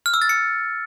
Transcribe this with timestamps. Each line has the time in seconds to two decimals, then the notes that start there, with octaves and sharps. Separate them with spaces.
0.06 F6
0.14 E6
0.22 A6
0.29 C#7